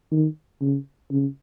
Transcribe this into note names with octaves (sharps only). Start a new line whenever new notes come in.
D#3
C#3
C#3